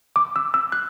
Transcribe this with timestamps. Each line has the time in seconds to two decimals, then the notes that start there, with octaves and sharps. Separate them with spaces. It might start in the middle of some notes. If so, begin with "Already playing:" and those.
0.16 D6
0.36 E6
0.54 E6
0.72 F#6